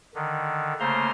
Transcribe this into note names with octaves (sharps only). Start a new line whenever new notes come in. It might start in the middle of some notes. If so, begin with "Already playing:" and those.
D3 D#3
C#3 A3 A#3 C5 A#5 C6